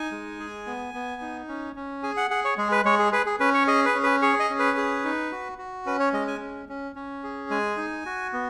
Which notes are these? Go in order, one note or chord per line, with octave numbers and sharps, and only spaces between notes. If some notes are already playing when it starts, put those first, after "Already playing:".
Already playing: D#4 G#5
G#3
G#4
B3
B3
D#4
C#4
C#4
G#4 G#5
F#5
G#4 F#5
C#5
G#3 G#4
B4
G#3 C#5
G#4
G#4 B4
G#4
C#4 B4
C#5
G#4 D#5
B4
C#4
B4
G#4 C#5
D#5
C#4
B4
G#4
D#4
F#4
F#4
C#4 B4
C#5
G#3 D#5
G#5
C#4
C#4
C#4
G#4
G#3 G#5
D#4
F#4
B3